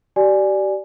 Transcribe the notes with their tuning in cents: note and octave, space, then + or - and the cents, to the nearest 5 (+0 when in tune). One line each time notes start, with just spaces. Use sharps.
G4 -35 D5 +5 G#5 +0